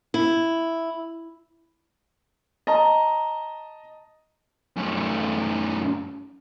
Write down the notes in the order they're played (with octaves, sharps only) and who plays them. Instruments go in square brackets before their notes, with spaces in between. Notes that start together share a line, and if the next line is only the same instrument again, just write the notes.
[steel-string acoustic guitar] E4
[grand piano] D#5 A5 A#5
[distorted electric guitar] F#2 A3